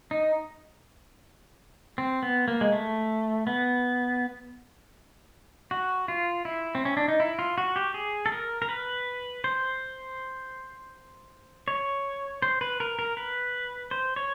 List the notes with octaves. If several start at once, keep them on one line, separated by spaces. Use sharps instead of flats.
D#4
C4
B3
A#3
G#3
A3
B3
F#4
F4
E4
C4
C#4
D4
D#4
E4
F4
F#4
G4
G#4
A4
A#4
A#4
B4
C5
C#5
C5
B4
A#4
A#4
B4
C5
C#5